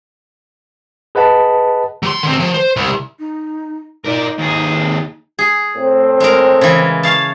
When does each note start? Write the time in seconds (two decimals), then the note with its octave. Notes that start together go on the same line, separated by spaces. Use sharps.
1.15 G#4 B4 D#5 F#5 A5 B5
2.03 F#3 C6
2.23 D3 C4
2.40 F3
2.54 C5
2.76 C2
3.19 D#4
4.05 D#4 A#4 D5
4.38 D#2 G#4
5.39 G#4
5.76 A2 C4
6.20 G#3 A#4
6.61 C#3 E3
7.03 C#5 F5 A5